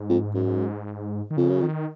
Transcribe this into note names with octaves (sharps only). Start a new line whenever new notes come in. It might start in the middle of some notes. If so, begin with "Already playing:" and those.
Already playing: G#2
F2
F#2
D#3
F2 C#3
F#2
F2 D#3